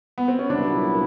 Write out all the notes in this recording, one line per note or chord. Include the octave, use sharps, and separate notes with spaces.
B3
C4
C#4
C2 A#2 F#3 B3 D4 E4